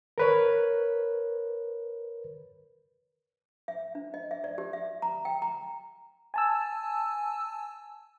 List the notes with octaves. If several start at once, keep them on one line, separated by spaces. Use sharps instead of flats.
A#4 B4 C#5
E5
D4
D#5
E5
D5
G4
E5
A#5
G5
A#5
G#5 A5 E6